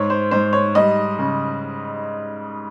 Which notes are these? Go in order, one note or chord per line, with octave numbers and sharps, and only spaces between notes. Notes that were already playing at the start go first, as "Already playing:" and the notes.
Already playing: G#2 C#5
C5
G#2 C5
C#5
G3 D#5
C#3